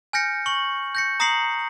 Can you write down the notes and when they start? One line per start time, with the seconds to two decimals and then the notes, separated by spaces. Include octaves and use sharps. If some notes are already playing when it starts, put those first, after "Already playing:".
0.13 G#5 F6 G6 A#6 C#7
0.46 C#6 F#7
0.95 G6 A#6 C#7
1.20 A#5 D#6 A#6 C7 C#7 F#7